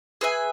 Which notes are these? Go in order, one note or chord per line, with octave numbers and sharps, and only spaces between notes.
G#4 B4 E5 G#5